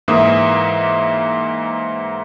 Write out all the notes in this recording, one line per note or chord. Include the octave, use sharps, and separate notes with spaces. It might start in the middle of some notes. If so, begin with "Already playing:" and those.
G#2 E3 A#3 E5 D#6